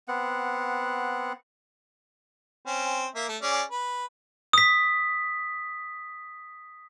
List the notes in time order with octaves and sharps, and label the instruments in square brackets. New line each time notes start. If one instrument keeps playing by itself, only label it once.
[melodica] B3 C4 F#5
[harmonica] C4 C#4
A#3 E5
A3
C#4 G#4 D5
B4
[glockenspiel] D#6 B6